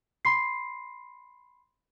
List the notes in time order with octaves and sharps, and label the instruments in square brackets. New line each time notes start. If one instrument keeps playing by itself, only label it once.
[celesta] B5 C6 C7